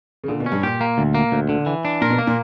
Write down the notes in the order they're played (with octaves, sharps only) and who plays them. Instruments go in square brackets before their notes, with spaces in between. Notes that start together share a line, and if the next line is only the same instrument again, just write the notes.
[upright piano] C#3
[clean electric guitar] A#2 [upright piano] D3
[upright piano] B2
[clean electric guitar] C#4
[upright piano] G2
[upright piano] A#2 [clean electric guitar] G4
[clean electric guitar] A#3
D2
A#3
D2
D3
E3
D4
[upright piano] A#2 [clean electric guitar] A#4
[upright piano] B2
[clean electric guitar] A#3
[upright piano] A#2